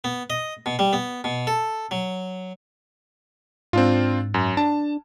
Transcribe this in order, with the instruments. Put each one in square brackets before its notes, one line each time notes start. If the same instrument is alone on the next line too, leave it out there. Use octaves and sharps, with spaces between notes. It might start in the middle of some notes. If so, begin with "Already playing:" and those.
[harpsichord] B3
D#5
B2
G3
B3
B2
A4
F#3
[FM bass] G#2 [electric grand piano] C4 D4 F4
[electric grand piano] F#2
[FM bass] D4 [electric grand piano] A5